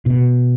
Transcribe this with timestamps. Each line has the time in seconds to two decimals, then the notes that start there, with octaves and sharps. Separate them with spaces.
0.06 B2